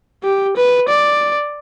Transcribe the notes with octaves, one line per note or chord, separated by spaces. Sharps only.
G4
B4
D5